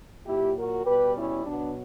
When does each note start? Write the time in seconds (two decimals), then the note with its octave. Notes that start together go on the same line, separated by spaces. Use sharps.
0.25 A#2 F#3 E4 G4
0.56 F#4 A#4
0.85 B2 G3 G4 B4
1.16 C#4 E4
1.46 B2 F#3 B3 D4